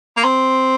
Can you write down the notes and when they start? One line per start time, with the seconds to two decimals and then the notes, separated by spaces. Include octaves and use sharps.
0.17 A#3
0.24 C4